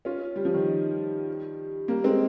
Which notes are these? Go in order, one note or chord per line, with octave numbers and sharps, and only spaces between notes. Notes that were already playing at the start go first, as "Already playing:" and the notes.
C#4 F4
G3
F3
D#3 G3
G3 A#3
G#3 C4